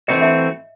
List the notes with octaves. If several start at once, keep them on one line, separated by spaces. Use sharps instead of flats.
E3 A3 C4 F#4 D#5
E5